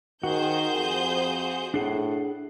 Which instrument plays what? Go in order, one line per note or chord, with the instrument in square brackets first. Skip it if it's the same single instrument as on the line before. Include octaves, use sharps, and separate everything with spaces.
[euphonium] D#3 [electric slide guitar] F#4 [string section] G#4 C5 G6
[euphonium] F2
[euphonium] A2 [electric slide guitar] D4 G#4 F#5